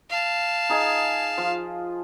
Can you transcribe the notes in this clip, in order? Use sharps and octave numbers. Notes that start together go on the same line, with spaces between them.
F5 A5
D#4 G#4 D#5
F3 F4